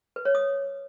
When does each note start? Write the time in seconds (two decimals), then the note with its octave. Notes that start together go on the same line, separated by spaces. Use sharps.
0.16 B4
0.25 C#5
0.35 D#6